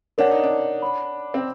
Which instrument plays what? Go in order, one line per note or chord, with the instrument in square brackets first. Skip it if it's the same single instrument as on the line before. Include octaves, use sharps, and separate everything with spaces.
[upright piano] D4 [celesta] A#4 C#5 F#5
[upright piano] D#4
D4
[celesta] C#5 F#5 B5
[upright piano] C4